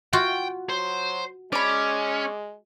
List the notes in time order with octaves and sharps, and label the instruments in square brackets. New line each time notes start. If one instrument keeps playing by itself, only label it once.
[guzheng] F4 F#4 F#5 [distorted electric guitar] G5
[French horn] F#3 [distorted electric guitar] C5
[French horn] G#3 [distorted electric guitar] C#4 [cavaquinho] D5 B5